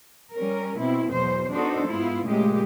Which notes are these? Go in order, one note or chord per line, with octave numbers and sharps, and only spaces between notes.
G3 C#4 A#4
B2 C4 E4
E2 B2 E3 F#3 C5
B3 D4 D#4 F#4 A4 C5
G#2 B3 E4 F4
A#2 C#3 G#3 A3 G4